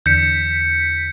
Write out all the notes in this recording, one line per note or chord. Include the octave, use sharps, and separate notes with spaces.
E2 D3 G6 B6 C#7